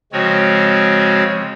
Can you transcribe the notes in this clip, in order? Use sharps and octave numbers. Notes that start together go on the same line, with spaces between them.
C#3 F3 G#3 C4 F#4 C#5